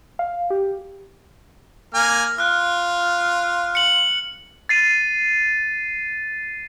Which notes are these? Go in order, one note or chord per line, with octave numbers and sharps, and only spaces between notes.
F5
G4
A#3 G#5 F6
F4 F6 F#6
C#7 F#7
A6 C7 D#7